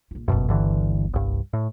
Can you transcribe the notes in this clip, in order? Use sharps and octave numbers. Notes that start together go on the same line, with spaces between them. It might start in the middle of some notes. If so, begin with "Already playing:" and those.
A#1 F4
G1 C#2 F#2 B2
G2 D3 E3
C2 G2
A2